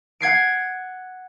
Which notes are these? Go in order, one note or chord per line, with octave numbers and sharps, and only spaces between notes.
F#5 G#6 C7 D7